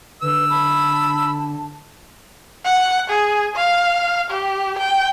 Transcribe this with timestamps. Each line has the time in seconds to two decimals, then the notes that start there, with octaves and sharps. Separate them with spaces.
0.22 D3 B4 E6
0.50 D3 A5 B5
2.65 F#5
3.09 G#4
3.56 F5
4.30 G4
4.79 G5